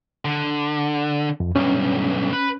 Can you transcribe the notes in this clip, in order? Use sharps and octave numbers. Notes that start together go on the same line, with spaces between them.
D3
F2
B1 G2 C#4
B4